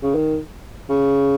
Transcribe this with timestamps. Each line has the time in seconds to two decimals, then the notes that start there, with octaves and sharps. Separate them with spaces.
0.03 C#3
0.15 D#3
0.89 C#3